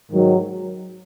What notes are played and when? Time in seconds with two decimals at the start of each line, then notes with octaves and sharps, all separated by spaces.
0.11 G#2 D#3 F#3